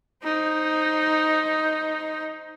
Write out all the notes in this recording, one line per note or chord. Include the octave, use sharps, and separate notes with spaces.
D#4 C5